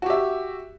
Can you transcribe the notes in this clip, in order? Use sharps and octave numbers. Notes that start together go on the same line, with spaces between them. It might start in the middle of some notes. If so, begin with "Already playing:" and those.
F#4 G4 E5